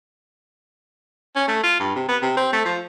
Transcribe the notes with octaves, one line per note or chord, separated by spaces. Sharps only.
C#4
A3
F4
G2
C3
B3
C3
C4
A3
F3